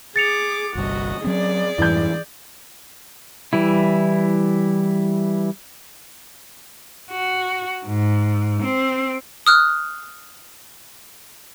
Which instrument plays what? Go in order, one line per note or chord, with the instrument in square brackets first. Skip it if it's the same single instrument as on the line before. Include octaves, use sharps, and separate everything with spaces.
[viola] G#4 D6 [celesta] A6 C#7 F7
[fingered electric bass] G1 C2 G2 [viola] F#4 D#5
[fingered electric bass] F#3 C4 C#4 [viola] G#4 D5
[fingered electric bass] F2 G#2 G3 [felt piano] E3 G6
[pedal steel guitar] E3 G3 E4
[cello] F#4
G#2
C4
[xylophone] D#6 F6 F#6